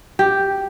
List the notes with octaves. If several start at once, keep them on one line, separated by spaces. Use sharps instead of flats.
G4